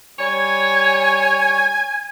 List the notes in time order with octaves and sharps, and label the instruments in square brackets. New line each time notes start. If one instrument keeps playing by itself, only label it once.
[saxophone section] G3 C#5 [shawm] G#5